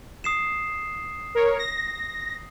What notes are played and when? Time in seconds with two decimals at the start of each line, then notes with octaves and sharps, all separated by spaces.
0.24 D#6 C7 E7
1.35 A#4 C#5
1.58 A#6